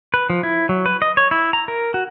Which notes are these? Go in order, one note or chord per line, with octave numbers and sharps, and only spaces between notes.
B4
F3
E4
F#3
B4
D#5
C#5
E4
A#5
A#4
F#4